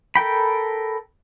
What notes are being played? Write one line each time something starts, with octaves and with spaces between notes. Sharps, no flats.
A4 A#4 G5 B5